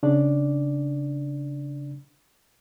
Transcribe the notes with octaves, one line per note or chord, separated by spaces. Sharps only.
C#3 D4 D5